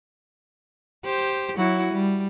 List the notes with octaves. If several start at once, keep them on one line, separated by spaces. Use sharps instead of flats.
G4 C5
F#3 E4 F#4
G3